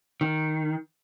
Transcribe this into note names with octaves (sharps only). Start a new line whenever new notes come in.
D#3